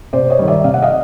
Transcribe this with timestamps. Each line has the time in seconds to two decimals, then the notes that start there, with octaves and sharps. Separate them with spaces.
0.13 C3 C5 D5
0.30 C#5 D#5
0.39 D#3 G3
0.48 D5 E5
0.64 C3 F5
0.74 F#5
0.82 D#5 F5